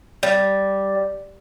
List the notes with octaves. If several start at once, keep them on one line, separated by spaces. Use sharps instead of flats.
G3